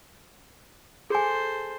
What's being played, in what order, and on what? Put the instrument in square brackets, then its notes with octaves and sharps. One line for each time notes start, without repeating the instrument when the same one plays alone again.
[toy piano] G#4 G#5 [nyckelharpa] A4 C5